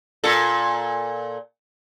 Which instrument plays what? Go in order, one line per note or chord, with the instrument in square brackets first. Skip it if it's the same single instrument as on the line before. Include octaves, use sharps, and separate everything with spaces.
[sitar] A#2 A4